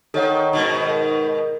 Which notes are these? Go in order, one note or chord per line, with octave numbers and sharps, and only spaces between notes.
D#3 A4 C#5 F#5
C#6
G#2 B2 D#3
A#4